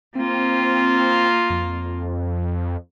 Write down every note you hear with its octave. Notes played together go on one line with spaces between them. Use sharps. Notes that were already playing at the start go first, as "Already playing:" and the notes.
A#3 C4 F4
F2